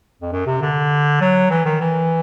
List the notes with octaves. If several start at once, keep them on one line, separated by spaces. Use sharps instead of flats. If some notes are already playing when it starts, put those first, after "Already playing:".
F2
F#2
C3
D3
F#3
E3
D#3
E3